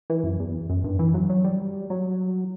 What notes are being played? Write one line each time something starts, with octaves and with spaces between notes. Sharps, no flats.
E3
F#2
E2
F#2
G2
E3
F#3
F#3
G3
F#3